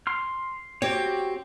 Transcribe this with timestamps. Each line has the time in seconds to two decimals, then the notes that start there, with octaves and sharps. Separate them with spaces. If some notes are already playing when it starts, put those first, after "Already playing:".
0.07 C6 F6
0.82 C4 F#4 G4 C#5